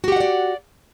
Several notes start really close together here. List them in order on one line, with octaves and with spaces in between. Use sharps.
F#4 G4 F#5 D#5 D5